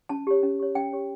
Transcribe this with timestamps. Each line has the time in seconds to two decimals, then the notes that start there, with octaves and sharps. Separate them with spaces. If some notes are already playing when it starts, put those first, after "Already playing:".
0.09 C#4 A5
0.27 G4 C#5
0.43 C#4
0.59 G4 C#5
0.75 C#4 G5
0.93 G4 C#5